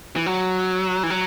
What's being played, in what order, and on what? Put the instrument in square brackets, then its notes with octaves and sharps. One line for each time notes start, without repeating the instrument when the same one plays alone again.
[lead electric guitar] E3
F#3
E3
F#3